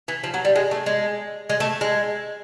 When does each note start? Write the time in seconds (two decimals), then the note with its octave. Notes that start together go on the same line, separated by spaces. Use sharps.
0.08 E3
0.24 F3
0.34 F#3
0.45 G3
0.56 G#3
0.71 A3
0.86 G#3
1.50 G#3
1.60 A3
1.81 G#3